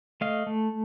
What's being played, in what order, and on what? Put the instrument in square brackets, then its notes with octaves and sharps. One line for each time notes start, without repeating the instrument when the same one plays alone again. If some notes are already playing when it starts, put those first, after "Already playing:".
[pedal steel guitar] A3 D#5 F5
A3